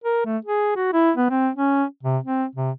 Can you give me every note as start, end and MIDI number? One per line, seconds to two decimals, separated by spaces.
0.04 0.24 70
0.25 0.38 57
0.45 0.74 68
0.76 0.89 66
0.93 1.12 64
1.17 1.30 59
1.30 1.50 60
1.56 1.85 61
2.03 2.18 48
2.24 2.46 60
2.56 2.71 48